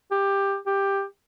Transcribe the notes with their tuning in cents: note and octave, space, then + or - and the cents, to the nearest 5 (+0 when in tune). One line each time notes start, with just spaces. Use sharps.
G4 +15
G4 +10